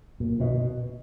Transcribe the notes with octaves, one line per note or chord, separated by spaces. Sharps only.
A#2
B2